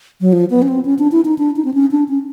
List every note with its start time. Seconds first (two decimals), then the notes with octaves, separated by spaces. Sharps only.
0.21 F#3
0.33 F3
0.50 B3
0.62 C#4
0.68 C4
0.85 C#4
0.99 D4
1.12 E4
1.25 D#4
1.38 D4
1.56 D#4
1.65 C4
1.74 C#4
1.91 D4
2.08 C#4